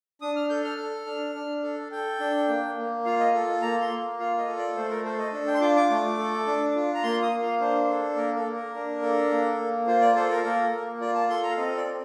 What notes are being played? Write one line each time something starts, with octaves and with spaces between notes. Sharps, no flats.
D4 D#6
F6
A4 G6
F6
A4
D4
D4
A4
A4 G5
D4
A#3
A#3
F4 F5
D#5
A4
A#3 A#5
C6
A#3
F4 F5
D#5
A4
D5
A3 C5
A#4
A4 C5
D#5
D4
G5
C6
F4 D6
D6
A3
A4
D4
F4
A#5
A#3 C6
D#6
A#3
F5
D4 C5
A4
A#3 A#4
A4
A#3
A#4
D4
A4
A#3
A#3
F4 C5
D5
A4 C5
A#4
A#3 A#4
A#3
F4 D5
A5
A4 C6
A#5
F5
C4 D#5
D5
C4